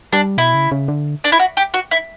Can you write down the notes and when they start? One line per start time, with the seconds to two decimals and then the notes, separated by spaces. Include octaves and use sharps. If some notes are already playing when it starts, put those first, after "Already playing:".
0.13 G3 D4
0.38 B2 E4
0.54 C#3
0.71 C#3
0.88 D3
1.24 D4
1.32 E4
1.39 F#4
1.57 G4
1.74 F#4
1.91 E4